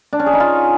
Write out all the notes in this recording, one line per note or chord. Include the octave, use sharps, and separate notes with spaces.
D4
C#4
G#4
D#4
F4